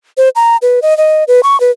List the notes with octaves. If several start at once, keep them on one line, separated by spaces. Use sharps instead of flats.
C5
A#5
B4
D#5
D#5
B4
C#6
B4